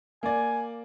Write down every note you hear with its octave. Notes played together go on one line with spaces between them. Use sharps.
A#3 D5 G#5